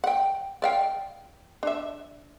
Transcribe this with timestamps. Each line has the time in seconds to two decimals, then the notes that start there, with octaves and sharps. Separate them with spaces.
0.04 F#5 G5
0.62 D5 F5 G5
1.63 D4 E5